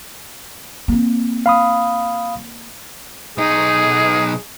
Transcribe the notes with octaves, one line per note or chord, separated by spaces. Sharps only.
A#3 C4
F5 B5 D#6
B1 D#4 G#4